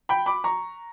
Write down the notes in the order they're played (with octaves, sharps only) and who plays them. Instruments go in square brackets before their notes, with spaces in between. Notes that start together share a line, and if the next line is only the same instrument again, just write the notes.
[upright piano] G5 B5
B5 D6
A#5 C#6